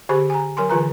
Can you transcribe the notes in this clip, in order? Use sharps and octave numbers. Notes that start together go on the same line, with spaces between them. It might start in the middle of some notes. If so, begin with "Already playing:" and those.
D3 G4 C5 B5
G#5 A#5
F#3 A#4 G#5 C6
D3 E3 F4 B4 A#5